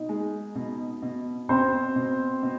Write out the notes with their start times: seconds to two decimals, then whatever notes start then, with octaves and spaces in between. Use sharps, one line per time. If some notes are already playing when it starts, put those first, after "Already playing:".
Already playing: B2 D#4
0.09 G#3
0.55 B2
1.02 B2
1.49 B2 C4 C5
1.96 B2
2.43 B2